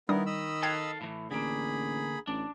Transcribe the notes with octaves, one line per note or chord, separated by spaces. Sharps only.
D#3 G3 B3 D4 E4 A#4 D#6
D#5 B5 E6
A4 F5 G5 F#6 G#6
A2 E3
A1 D3 A#3 G#4 B5
A1 D4